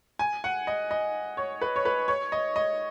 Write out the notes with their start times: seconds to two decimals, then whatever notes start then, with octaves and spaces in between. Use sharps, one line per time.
0.19 G#5
0.44 F#5
0.67 D#5
0.91 D#5
1.37 C#5
1.62 B4
1.76 C#5
1.85 B4
2.08 C#5
2.32 D#5
2.56 D#5